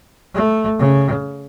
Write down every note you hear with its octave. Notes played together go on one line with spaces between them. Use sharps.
A3
C#3